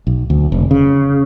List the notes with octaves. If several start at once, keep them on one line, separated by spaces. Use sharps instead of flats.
B1
D2
F1
C#3